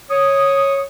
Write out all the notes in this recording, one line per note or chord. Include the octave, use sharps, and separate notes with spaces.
C#5 D#6